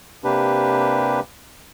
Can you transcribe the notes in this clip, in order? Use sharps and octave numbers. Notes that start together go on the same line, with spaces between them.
C3 A#3 D4 G4 B4